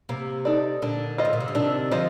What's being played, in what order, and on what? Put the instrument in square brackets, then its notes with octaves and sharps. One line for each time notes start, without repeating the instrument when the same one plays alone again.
[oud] C3 [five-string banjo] A#3
[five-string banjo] D#4 A4 D5
[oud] A#2 D3 [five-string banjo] D4
[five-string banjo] F4 C5 D#5
[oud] A2
A#2
C3
D3
[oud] C3 D#3 [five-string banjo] D4
[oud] D3 F3 [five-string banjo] F4 C5 D#5